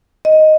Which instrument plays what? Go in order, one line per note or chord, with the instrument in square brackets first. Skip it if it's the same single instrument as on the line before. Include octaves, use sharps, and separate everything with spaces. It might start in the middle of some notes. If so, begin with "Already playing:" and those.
[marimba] D#5